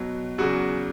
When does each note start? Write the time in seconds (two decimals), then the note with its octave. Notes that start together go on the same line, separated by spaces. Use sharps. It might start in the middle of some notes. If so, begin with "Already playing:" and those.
Already playing: B2 F#3
0.38 E2 C#3 F#3 F#4